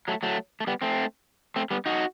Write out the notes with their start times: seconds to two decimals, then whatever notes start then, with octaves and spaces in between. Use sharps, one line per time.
0.08 F#3 A3
0.23 F#3 A3
0.60 A3
0.67 G3 B3
0.82 A3 C4
1.56 A3 C4
1.71 G3 B3
1.86 D#4 F#4